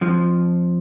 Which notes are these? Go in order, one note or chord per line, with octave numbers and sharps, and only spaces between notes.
F2 F3